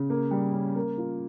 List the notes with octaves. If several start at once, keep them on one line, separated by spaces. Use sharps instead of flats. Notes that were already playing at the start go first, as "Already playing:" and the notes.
Already playing: C#3
A#3
G3
C#4
A#3
F4